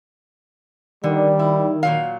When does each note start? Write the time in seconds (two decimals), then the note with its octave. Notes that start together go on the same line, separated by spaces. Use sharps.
1.04 D3 D#3 G3
1.39 E4
1.83 A#2 F#3 F5